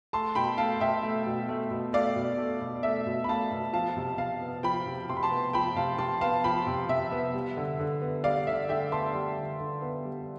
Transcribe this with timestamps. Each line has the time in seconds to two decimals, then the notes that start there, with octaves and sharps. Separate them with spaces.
0.13 A3 A5 C6
0.35 B2 G5 B5
0.58 A3 F5 A5
0.80 B2 E5 G5
1.03 A3
1.26 B2
1.49 A3
1.71 B2
1.93 A3 D5 F5
2.16 B2
2.38 A3
2.61 B2
2.83 A3 E5
3.07 B2
3.24 B5
3.29 A3 F5 A5
3.51 B2
3.73 F3 F5 A5
3.97 C3
4.18 C3 F5 A5
4.42 B3
4.63 F3 G5 B5
4.86 C3
5.09 C3 C6
5.17 B5
5.23 A5 C6
5.31 B3
5.53 F3 G5 B5
5.76 C3 F5 A5
5.98 C3 A5 C6
6.21 B3 F5 A5
6.44 F3 G5 B5
6.67 C3
6.89 C3 E5
7.12 B3
7.34 G3
7.57 D3
7.79 D3
8.02 B3
8.24 G3 D5 F5
8.47 D3 E5
8.69 D3 E5 G5
8.92 B3 A5 C6
9.14 G3
9.38 D3
9.60 D3
9.82 B3
10.05 G3